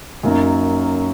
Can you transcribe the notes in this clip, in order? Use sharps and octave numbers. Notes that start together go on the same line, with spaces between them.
F#2 F#3 A#3 D#4